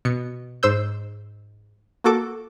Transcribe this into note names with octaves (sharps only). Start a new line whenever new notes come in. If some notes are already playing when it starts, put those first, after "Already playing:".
B2 C#7
G#2 C5 E6 G6
A#3 F#4 A4 D6